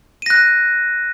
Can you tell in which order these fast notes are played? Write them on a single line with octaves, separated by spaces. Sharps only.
D#7 A#6 F#6